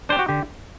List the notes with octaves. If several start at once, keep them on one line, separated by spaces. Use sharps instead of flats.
D4 G4 C5
F#4
D3 G4